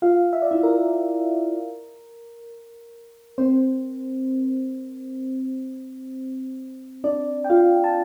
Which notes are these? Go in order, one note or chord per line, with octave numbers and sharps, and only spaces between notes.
F4 F5
E5
D5
E4 E5
A#4
C4 C5
D4 D5
G5
F4 F5
A5